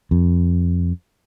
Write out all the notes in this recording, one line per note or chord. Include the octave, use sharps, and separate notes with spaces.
F2